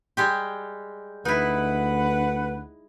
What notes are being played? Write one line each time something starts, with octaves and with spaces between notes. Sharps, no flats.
G3 G#3 G4
D2 D#4 E4 B4 F#5